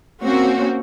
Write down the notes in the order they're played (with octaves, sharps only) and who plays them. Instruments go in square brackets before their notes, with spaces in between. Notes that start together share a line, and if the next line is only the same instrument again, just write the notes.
[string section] A#3 C4 C#4 F#4